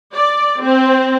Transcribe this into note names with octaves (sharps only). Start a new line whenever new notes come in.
D5
C4